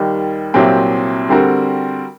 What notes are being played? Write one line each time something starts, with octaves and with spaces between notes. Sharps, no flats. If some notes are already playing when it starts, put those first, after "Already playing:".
Already playing: D#2 D#3 G3
C2 A#2 F#3 C4 G4
D3 G3 C4 F#4 A#4